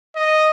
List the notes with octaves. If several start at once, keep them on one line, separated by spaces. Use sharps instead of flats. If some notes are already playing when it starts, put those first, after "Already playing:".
D#5